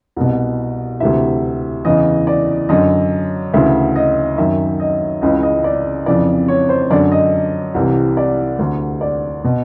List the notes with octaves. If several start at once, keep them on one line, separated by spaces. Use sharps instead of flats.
C2 B2
D2 C3 E3 E5
E2 C#3 E3 D#5
D5
F#2 D3 D#5
D2 C#3 E3 E5
D#5
F#2 D#3 E5
D#5
C#2 C#3 E3 D#5
D#5
D5
F2 C#3 E3 D5
C#5
C5
F#2 D3 D5
D#5
C2 C3 E3
D5
D2 D3
D5
B2